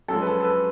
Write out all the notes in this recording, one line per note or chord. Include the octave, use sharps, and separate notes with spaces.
F#2 F3 G#3 A4
B4
A4
A4
B4